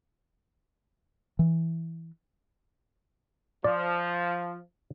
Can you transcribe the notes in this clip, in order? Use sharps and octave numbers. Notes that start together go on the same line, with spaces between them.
E3
F3 D5